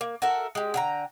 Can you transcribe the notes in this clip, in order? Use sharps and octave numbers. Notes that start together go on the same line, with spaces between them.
A#3
F#4 A4 A#4 E5
G#3 G4
D3 G5 A#5